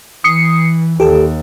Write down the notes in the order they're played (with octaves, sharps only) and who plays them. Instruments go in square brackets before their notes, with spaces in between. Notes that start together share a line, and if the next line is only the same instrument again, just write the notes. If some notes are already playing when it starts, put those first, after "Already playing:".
[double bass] E3 [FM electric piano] D#6 C7 C#7
[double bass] D#2 [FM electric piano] G4 A4